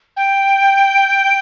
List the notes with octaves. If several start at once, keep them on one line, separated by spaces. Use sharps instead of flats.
G5